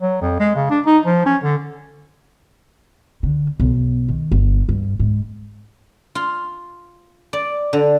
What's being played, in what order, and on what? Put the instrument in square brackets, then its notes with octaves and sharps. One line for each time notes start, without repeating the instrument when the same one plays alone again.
[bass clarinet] F#3
F2
G#3
C#3
D4
D#4
F3
C#4
D3
[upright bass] D3
B1
D#3
G1
G2
G#2
[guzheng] F4
D5
D3